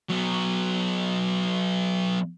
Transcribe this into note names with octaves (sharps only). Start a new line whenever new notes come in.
F#3 B3